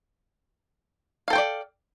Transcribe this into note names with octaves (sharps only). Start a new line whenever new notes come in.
A4 C5 D5 F5 G5